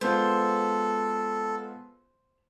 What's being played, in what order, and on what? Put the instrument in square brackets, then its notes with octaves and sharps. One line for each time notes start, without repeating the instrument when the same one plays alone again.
[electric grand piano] G#3 B3 F4 [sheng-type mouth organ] A4 [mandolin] C5